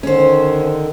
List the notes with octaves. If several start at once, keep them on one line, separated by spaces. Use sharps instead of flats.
D3 D#3 C#4 C5